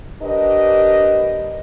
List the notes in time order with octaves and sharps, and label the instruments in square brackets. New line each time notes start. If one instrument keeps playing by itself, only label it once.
[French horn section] D4 G4 A#4 B4 D#5